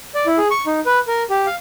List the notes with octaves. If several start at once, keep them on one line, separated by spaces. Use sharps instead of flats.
D5
E4
G#4
C#6
D#4
B4
A#4
G4
F5